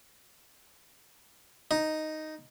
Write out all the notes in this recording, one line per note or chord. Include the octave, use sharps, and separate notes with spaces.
D#4